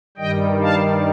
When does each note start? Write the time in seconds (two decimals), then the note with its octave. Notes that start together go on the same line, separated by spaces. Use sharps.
0.17 G2 D#3 G3 D#5 G5
0.61 F5 A5